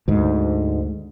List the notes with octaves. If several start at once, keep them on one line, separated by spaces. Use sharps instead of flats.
D2 G#2